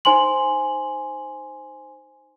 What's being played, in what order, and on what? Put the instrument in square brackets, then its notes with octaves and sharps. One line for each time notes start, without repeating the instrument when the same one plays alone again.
[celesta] D#4 C5 G#5 C6 F#7